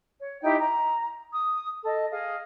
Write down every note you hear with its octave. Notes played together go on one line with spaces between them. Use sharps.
C#5
D#4 E4 G4 G5
A#5
D#6
A4 D#5
G#4 D#5 F5